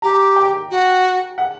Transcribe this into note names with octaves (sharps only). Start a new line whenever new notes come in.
G4 A#5
G5
F#4
F#5